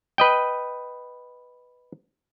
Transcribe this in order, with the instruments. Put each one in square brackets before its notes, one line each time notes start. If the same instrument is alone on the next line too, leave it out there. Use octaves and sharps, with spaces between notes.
[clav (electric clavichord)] B4 D#5 G5